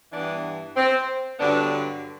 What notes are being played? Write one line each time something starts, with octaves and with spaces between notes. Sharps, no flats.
G2 E3 B3 D4
C4
G2 D3 F#3 B3 D4